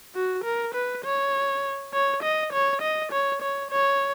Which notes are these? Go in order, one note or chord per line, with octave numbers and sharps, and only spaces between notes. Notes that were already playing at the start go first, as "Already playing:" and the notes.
F#4
A#4
B4
C#5
C#5
D#5
C#5
D#5
C#5
C#5
C#5